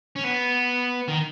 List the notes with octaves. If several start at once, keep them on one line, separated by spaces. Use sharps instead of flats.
C#4
B3
D#3